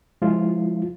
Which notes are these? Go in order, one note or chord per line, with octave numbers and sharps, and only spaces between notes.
F3 G#3 E4 F4